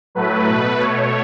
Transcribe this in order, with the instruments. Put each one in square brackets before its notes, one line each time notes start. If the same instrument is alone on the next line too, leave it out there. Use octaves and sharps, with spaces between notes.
[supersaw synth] A2 F#3 A3 B4
B2 A3
B2 A3 C#5